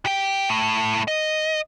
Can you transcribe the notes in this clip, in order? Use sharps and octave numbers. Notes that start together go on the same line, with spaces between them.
G4 G5
A2 A3
D#5